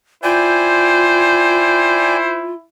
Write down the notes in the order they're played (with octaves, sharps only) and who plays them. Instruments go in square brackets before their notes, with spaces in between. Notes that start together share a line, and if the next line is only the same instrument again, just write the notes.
[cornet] E4 [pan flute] F4 [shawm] C5 [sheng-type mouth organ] D5 G5 G#5